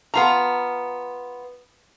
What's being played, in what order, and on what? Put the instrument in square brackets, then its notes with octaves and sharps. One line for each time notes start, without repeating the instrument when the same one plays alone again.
[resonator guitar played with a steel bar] B3 F4 A#5